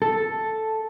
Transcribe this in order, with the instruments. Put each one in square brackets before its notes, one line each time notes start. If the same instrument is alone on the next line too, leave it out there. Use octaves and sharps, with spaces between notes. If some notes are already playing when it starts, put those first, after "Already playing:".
[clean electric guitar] A4